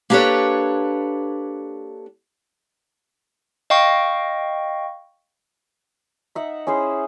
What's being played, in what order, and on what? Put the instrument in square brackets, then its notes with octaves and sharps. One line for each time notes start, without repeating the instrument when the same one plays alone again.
[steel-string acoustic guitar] A#3 D4 G4 A4 B4 C#5
[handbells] D#5 F5 G5 C#6
[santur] D#4 E5 F#5
C#4 E4 G#4 C5